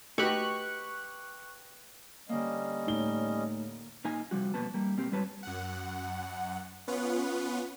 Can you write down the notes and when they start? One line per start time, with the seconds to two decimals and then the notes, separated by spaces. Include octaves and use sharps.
0.18 A3 D#4 F#4 G4 B4 B5 C#6 F#6
2.29 D3 G3 A#3 C#4 D#5
2.87 A2 D#4 G7
4.04 A#2 A#3 D#4 G#5
4.31 C3 F3 G3 F#4
4.54 F2 B2 A#3 B4 A5
4.74 G3 A#3
4.97 B2 A#3 C4 G4
5.12 G#2 F#3 G3 B4 C#5 A5
5.43 F#2 F#5
6.88 B3 C#4 F4 B4 F#5